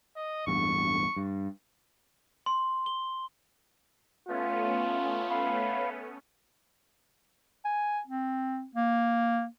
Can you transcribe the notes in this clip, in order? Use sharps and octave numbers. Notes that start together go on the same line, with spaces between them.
D#5
A1 E2 G2 C#6
G2
C6
G7
A3 B3 C#4 F4
F5 B5
G#5
C4
A#3